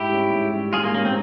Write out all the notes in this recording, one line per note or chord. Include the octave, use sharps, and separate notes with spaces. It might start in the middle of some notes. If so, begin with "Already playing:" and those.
Already playing: G#2 E4 G4
G3 C#4
G#2
G3 C#4
G#2 F4 G#4
A#3
G3 A#3 C#4
C4